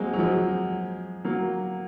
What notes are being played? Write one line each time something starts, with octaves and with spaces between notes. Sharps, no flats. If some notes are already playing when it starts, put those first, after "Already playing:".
Already playing: F#3 G#3 A#3 C4
F#3
F3 G#3
F#3 A#3